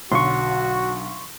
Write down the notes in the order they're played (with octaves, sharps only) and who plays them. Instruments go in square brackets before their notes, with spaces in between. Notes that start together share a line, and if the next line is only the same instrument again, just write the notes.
[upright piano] B1 D3 F#3 [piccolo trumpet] F#4 [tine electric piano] C6 C#6